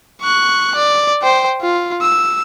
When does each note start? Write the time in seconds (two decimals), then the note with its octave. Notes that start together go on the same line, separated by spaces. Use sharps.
0.22 C#6 F#6
0.75 D5
1.22 C5 G5
1.61 F4
2.02 E6